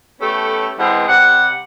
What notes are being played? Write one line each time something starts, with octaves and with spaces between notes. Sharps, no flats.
A3 B3 C#4 G4 A4
B2 E3 G#3 C4
C3 G3 F#5